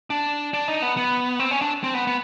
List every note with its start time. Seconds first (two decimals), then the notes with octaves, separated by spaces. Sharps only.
0.10 D4
0.54 D4
0.68 D#4
0.82 B3
0.97 B3
1.39 C4
1.51 C#4
1.61 D4
1.84 C4
1.95 B3
2.07 B3